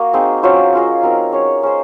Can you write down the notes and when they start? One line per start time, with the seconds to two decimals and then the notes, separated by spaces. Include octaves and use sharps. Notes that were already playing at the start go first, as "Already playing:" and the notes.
Already playing: A#3 F#4 A#4
0.13 C4 D#4 G#4
0.43 F#3 C#4 F4 C5
0.73 C#4 F4 G#4 D#5
1.03 F#3 C4 D#4 A#4
1.32 C#4 G#4 C#5
1.62 G#3 C#4 G#4 C5